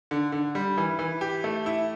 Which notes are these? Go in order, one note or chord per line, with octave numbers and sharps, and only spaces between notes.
D3
D3
G3
E3
E3
G4
A3
E4